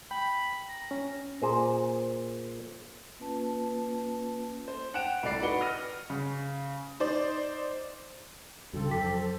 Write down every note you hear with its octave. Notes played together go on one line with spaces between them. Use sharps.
G5 B5
A#5
C#4
A#2 G#4 C5
A#3 C#4 F4 B4 A5
C5
F#5 G5 F#6 D7 E7 F7
C2 A2 D5 C7 D7
D#4 F#4 B4 F#5 C#7 G7
F6 A#6 D#7
C#3
D#4 C5 D5
G2 C#3 C4 F#4 A4
F2 F#3 G5 D6 B6